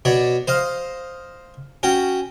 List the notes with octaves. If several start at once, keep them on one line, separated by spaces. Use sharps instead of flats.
B2 C#5 D5
C5 D#5 F5
C#4 F#4 G5